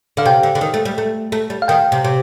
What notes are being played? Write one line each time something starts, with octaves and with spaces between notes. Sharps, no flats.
D3 F5
C3 G5
D3
D3
D#3
A3
G3
A3
A3
G3
F5
D#3 G5
C3
C3